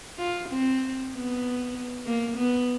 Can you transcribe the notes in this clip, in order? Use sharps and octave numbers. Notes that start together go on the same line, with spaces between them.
F4
C4
B3
A#3
B3